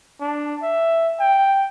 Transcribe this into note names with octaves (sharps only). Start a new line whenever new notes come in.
D4
E5
G5